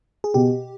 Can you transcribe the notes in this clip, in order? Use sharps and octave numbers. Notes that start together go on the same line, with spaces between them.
G#4
B2 G4